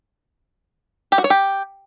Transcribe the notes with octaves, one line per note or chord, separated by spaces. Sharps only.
G4
F#4
C#5
G4